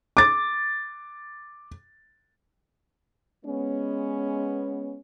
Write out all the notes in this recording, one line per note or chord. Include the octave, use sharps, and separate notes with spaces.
D6 A6
G#3 B3 C#4